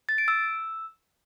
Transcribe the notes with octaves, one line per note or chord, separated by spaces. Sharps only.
A6
D7
E6